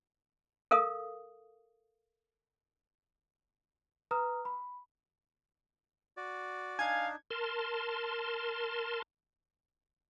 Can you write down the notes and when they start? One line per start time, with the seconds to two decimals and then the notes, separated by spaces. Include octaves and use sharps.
0.71 A4 A#4 F5 D#6
4.11 B4 A#5 D#6 F6
4.45 B5
6.17 F#4 D5
6.79 D4 D#4 F5 G#5 G#6
7.30 A#4 A5 C6